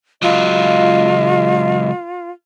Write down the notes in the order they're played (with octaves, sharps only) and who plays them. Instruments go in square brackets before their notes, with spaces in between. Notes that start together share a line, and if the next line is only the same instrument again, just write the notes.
[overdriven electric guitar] C#2 F#3 [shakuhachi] F4 [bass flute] D#5